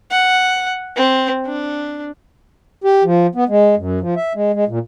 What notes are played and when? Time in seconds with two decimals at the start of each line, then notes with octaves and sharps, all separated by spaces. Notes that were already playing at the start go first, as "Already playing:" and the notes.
0.11 F#5
0.96 C4
1.46 D4
2.84 G4
3.04 F3
3.35 B3
3.49 G#3
3.77 F#2
4.01 F3
4.16 E5
4.35 G#3
4.54 G#3
4.68 A#2